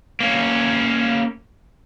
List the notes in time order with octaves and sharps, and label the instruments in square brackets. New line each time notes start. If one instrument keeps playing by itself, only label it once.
[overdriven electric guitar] A#3 C#4